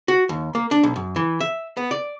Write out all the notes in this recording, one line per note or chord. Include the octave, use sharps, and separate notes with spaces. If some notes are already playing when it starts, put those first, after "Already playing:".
F#4
D#2
A#3
D4
B1
F#2
E3
E5
B3
D5